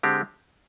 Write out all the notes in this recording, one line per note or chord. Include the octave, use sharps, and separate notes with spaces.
D3 G#3 C4 G4